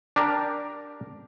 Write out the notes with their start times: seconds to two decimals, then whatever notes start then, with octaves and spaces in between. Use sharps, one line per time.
0.16 D4 G4 A#4